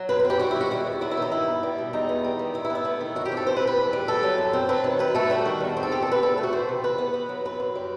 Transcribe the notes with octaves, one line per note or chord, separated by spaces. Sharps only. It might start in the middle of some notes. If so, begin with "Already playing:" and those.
Already playing: F#3
F#2 B4
B4
C4
G4
G3 F#4
E4
D#3 F#4
E2 E4
B3
F#3 E4
E4
D#3 D#4
G2 E4
B3
G3
B2
E2 D#4
B3
G3
D#3
G2 E4
E4
B3
E4
A3
D#3
F#2 F#4
G4
C4
A4
E3 C5
B4
C3
B4
E2
G3
A3 A4
F#3
F#2
C4
F#3 B4
D#3
F#2 B4
A3 A4
G3 F#4
D#3
E2
C4
A4
D#3 G4
A4
C3 B4
E2 A4
A3
F#4
E3 C5
C3
E2 B4
B3
B3
F#3
F#2 B4
F#2
G3